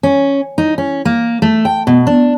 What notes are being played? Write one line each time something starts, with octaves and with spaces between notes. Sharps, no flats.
C#4
D#4
C#4
A#3
A3
G5
B2
D4